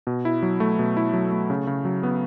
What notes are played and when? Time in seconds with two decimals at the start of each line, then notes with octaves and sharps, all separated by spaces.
0.07 B2
0.25 E4
0.42 F#3
0.60 A3
0.79 B2
0.97 E4
1.14 F#3
1.32 A3
1.50 C#3
1.67 C#3
1.85 F#3
2.03 B3